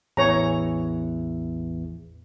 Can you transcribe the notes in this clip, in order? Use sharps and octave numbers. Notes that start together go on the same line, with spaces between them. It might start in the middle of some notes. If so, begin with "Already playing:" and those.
A1 E2 E3 C#5 A#5